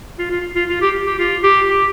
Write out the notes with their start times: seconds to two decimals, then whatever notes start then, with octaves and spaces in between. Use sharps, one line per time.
0.19 F4
0.31 F4
0.56 F4
0.69 F4
0.82 G4
1.07 G4
1.19 F4
1.44 G4
1.69 G4